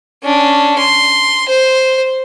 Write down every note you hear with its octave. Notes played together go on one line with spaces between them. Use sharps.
C#4 D4
C6
C5